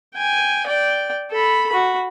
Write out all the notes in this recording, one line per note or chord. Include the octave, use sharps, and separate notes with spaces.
G5 G#5
D5 G5
A4 B5
F#4 B5